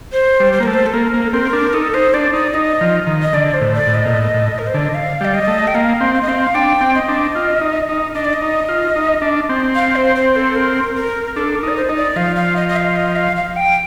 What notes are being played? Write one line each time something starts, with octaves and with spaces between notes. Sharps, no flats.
C5
G3
C5
A#3
A3 A#4
C5
A4
A#3 A#4
A#3
A4
C4 A#4
D4
D#4 A4
D#4 C5
D4 D5
D#4 D5
D#4 D#5
F3
D#3
D#5
D3 D5
C5
A2
D5
A2
D#5
A#2
A2
A2
A#4
C5
D3 D5
D#5
F5
G3 D5
D#5
A3
G5
A#3 F5
C4
F5
D#5
C4 F5
D4 G5
C4
D#5
D4
F4
D#4
D#4
D4 D#5
D5
D#5
D#4
F4
D#4
D4
C4
F5
C5
C5
A4
A#4
A#4
D4 A4
A#4
D#4 D5
C5
D#4 D#5
D5
F3 F5
F5
D#5
D#5
F5
D#5
F5
F5
G5